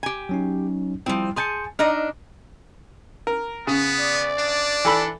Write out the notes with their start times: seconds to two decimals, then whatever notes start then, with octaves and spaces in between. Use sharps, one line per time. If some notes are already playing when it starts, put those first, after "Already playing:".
0.03 G4 G#5
0.29 F#3 C#4 D#4
1.06 F3 G3 C4 E4 G5
1.36 G#4 G#5 A5 C6 G6 C#7
1.79 D4 D#4 D#5 F6
3.27 A#4
3.67 C#3 B3
3.99 D5
4.38 D4
4.85 E3 A4 B5